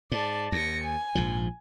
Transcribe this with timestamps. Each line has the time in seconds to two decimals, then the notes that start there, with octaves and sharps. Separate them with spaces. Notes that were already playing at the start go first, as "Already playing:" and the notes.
0.12 G#2 D5 A5
0.52 D#2 A#6 C#7
0.84 G#5
1.15 A#1 G#2 F3